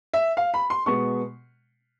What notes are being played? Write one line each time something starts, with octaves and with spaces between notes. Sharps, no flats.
E5
F5
B5
C6
B2 G#3 B3 C#6